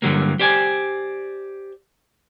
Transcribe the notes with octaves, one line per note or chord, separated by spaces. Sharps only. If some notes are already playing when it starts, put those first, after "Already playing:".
G2 A#2 D3 F#3 G3 A#3
G4 C5 D5 G#5